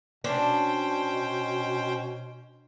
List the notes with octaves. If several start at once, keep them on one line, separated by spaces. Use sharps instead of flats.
B2 C#4 D4 C5 G5